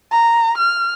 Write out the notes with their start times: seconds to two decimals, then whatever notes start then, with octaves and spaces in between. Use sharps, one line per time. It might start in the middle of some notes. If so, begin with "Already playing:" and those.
0.11 A#5
0.58 F6